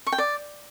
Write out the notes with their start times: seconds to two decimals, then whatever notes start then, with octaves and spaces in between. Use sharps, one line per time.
0.07 C#6
0.12 G5
0.18 D5